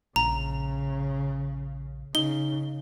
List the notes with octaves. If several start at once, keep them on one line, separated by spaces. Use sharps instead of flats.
A#1 C#3 A#5
C#3 D#4 G7